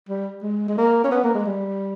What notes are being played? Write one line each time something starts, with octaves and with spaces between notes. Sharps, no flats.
G3
G#3
G#3
A#3
C#4
B3
A#3
G#3
G3